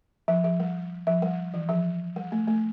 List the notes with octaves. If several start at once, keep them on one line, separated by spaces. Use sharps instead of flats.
F3
F3
G3
F3
G3
E3
F3
G3
A3
A3